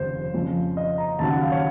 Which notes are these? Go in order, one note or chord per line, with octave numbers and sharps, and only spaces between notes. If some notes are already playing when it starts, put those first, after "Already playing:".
Already playing: F1 D#2 C#3 C5
F2 C#3 F3
D#5
A#5
D#2 C#3 F#3 A5
F#5
F5
C#5